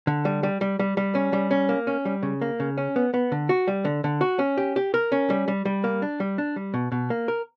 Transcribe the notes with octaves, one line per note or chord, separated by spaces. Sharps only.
D3
G3
G3
G3
G3
G3
C#4
G3
C#4
A#3
C#4
G3
C#3
A#3
C#3
C#4
B3
B3
D3
F#4
G3
D3
D3
F#4
C#4
G4
G4
A#4
C#4
G3
G3
G3
A#3
D4
G3
D4
G3
B2
B2
A#3
A#4